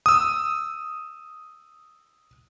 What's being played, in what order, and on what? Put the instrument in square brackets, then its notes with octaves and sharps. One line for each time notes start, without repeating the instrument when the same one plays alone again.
[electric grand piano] D#6 E6